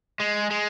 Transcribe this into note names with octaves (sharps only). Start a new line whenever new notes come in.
G#3
G#3